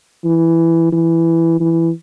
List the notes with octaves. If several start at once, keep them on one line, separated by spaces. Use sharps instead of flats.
E3
E3
E3